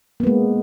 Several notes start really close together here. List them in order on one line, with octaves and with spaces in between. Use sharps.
A#3 B3 G#3